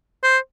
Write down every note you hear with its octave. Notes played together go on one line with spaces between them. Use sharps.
C5